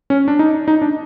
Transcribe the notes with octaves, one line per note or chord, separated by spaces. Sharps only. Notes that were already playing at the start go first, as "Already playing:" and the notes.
C#4
D4
D#4
D#4
D4